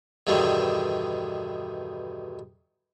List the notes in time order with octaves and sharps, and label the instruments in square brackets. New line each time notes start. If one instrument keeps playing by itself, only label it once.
[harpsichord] E2 G2 B2 D3 D#3